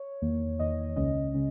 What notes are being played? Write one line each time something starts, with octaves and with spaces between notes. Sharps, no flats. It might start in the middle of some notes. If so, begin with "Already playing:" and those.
Already playing: C#5
E2 D#3 A#3
E2 D#3 A#3 D#5
C#2 C#3 G#3 C#4 D#5
C#3 G#3 C#4